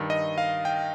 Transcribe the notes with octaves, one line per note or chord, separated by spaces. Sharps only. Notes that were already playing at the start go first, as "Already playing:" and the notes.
Already playing: G2 D#3
D#5
F5
G5